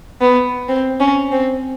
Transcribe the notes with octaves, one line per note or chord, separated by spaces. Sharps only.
B3
C4
C#4
C4